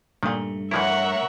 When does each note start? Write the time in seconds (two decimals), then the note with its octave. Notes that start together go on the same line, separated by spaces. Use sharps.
0.23 G2 A#2 D#3 A3
0.71 E3 F3 E4 A#4 C#5 E5 F#5